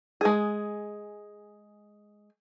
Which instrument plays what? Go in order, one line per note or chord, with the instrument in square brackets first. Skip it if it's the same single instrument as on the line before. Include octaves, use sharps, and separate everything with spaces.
[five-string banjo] G#3 G#4